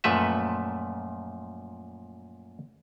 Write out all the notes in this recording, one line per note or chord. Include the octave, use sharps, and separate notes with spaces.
F#2 A#2 F3 A3 B4 E5